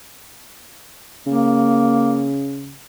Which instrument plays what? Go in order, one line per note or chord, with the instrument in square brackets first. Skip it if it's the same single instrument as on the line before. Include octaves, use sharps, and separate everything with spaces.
[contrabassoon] C#3 [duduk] A#3